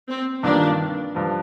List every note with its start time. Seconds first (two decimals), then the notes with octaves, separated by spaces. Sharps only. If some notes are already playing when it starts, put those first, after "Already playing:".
0.08 C4
0.43 G2 D#3 A#3 D4 F4
1.15 G2 F3